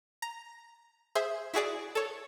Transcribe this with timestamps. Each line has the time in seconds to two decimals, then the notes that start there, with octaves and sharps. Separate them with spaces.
0.22 A#5
1.15 G#4 C5 E5
1.54 E4 F#4 G#4 D5
1.95 A4 C#5